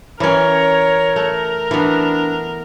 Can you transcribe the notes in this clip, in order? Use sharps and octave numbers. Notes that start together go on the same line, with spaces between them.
E3 C#4 A#4 C#5
A3 A#4
E3 B3 D4